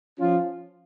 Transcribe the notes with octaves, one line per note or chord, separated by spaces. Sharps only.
F3 C#4 F4